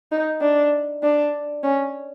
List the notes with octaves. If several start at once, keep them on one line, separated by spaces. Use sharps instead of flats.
D#4
D4
D4
C#4